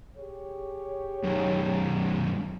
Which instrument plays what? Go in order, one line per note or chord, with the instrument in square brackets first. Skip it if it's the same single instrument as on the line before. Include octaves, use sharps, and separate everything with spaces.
[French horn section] G4 G#4 C#5
[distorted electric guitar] F#2 D#3